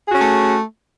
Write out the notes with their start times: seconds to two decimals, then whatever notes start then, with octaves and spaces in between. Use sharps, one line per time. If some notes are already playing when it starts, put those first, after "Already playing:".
0.04 G#4
0.09 F#4
0.14 C#4
0.19 A3